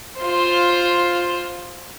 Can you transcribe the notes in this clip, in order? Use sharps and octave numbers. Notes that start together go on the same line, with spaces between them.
F4 C5